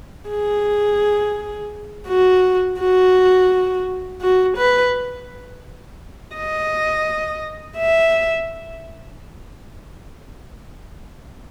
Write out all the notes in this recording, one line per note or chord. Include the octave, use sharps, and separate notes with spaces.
G#4
F#4
F#4
F#4
B4
D#5
E5